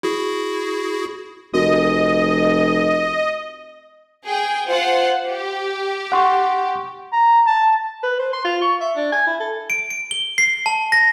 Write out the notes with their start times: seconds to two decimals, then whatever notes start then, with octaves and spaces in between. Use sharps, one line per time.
0.03 E4 F#4 G#4
1.53 F1 F#4 A#4 D#5
4.25 G#4 G5
4.68 F4 C5 F#5
5.27 G4
6.12 F#5 C6 C#6
7.12 A#5
7.46 A5
8.03 B4
8.19 C5
8.33 C6
8.45 F4
8.62 C#6
8.81 E5
8.96 D4
9.12 G#5
9.27 E4
9.40 A4
9.70 D7
9.91 D7
10.11 G7
10.38 C7
10.66 A5
10.92 A#6